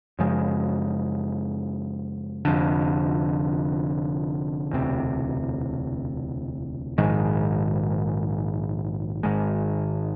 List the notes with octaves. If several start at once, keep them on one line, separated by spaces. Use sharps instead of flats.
F#2 C#3 F3 G#3
F1 F2 D3
E1 D2 C3
A#1 G#2 D#3 G#3
G#1 G#2 D#3 G#3